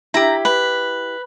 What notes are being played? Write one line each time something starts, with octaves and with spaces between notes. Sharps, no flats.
E4 G4 A#5
B4